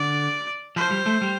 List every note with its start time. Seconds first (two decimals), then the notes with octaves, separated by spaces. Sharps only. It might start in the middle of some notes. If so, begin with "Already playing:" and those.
Already playing: D3 D5
0.76 F3 C5
0.91 G3
1.06 A3
1.21 G3